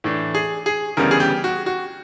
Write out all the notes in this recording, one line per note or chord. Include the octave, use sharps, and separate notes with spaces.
A2 E3 A3 D4
G#4
G#4
D2 C#3 E3 G3 B3 A#4
G#4
G4
F#4
F#4